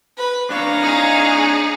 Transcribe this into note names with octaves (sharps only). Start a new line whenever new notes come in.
B4
D4 C#5 F5 A#5
D#4 G#4